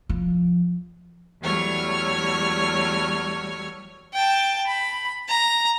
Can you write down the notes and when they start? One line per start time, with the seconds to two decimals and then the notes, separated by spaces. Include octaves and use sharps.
0.09 F3
1.41 E2 F#3 G3 A3 C#5 F6
4.14 G5 A5
4.66 B5
5.29 A#5